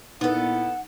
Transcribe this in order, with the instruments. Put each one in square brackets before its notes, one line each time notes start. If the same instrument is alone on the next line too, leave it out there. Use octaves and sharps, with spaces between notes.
[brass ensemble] A#2 E4 [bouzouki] B3 A4 [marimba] D#4 B4 [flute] F#5